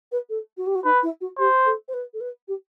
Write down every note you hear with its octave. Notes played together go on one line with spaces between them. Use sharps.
B4
A4
F#4
G4
F#4
D#4 B4
E4
F#4
G4 C5
A4
C5
B4
A4
B4
G4